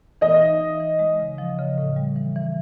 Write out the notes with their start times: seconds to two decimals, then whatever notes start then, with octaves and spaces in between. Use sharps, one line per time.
0.21 E3 D#5
0.41 D#4
0.61 E3
0.80 E3
0.99 G#3
1.20 C#3
1.38 F3
1.59 C#3
1.78 A2
1.96 G3
2.16 E3
2.36 E3